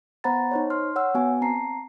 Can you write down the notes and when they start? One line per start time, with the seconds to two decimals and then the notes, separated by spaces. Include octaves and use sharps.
0.24 B3 C5 F#5 A#5 B5 A6
0.51 D#4 C5 C#5
0.70 C6 F6
0.96 C#5 F#5 E6
1.14 B3 F#4 G#5
1.41 C4 A5 A#5 C7